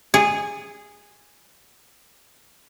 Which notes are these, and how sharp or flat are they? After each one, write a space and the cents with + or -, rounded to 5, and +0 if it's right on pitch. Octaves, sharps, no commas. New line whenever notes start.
G#4 -10